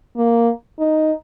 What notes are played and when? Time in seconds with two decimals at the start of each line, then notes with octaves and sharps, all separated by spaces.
0.17 A#3
0.79 D#4